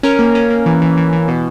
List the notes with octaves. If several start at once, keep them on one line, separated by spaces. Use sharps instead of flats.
C#4 A#4
A#3
C#4
A#3
E3
E3
E3
E3
B2